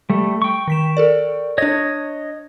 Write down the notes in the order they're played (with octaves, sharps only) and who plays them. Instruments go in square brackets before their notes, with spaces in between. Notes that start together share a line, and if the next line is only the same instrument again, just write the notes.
[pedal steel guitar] G3 A3
G5 C#6
[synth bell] D#3 B6 E7
A4 A#4 D5
[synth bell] D4 G#6 [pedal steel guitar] C#5 D#5